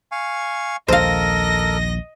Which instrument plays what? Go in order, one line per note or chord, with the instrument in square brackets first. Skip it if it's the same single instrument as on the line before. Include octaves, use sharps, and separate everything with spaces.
[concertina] F5 G#5 C#6
[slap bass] A#1 D#2 [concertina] A4 A#4 [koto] C5 F5 [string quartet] D#5 A#6